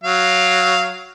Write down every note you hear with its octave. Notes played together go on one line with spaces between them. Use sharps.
F#3 F5